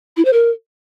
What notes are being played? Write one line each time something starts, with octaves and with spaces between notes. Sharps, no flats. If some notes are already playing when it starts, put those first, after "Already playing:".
E4
C5
A#4